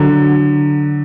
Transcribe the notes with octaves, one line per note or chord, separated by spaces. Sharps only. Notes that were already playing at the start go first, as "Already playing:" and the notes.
Already playing: D3 F#3